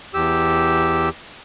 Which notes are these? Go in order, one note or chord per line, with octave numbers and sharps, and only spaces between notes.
E2 G4 E6